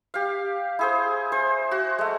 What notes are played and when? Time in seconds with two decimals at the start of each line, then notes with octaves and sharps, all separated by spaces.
0.14 G4 F5
0.79 E4 G#4 C5
1.32 C5 G#5
1.71 F#4
1.99 G#3 A3